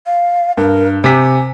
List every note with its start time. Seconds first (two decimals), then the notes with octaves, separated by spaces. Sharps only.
0.06 F5
0.57 G2 A#4
1.04 C3 G4 G#5 B6